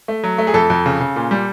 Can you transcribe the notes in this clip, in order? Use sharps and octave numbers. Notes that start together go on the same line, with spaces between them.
A3
F#3
A3
G#4
F2 A4
F2
C#3
C#3
A#2
G3